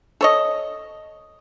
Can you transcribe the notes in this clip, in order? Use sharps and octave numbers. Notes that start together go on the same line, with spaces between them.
A4 C#5 D#5